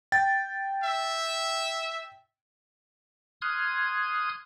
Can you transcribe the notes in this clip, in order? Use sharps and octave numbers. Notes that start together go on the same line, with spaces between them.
G5 A6
E5
C6 D#6 F6 F#6 G#6